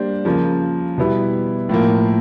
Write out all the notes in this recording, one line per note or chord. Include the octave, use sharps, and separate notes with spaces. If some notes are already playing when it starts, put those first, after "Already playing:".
Already playing: G3 A#3 D4 G4 C5
C#3 F3 A#3
B2 G3 B3 E4
A2 F3 A#3